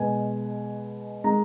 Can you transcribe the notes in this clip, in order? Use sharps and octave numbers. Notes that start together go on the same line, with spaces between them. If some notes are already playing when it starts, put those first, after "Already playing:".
Already playing: B2 G#3 G#5
D#3 G#3 A#5